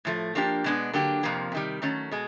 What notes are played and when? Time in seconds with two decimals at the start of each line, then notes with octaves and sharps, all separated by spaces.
0.05 A2 F3 A3
0.35 F3 A#3 D4 G4
0.64 B2 G#3 B3 D4
0.93 D3 F#3 A#3 D4 G4
1.23 F2 C3 F3 A#3
1.52 C3 D#3 G3
1.82 D#3 F#3 A3 C#4
2.11 B2 G#3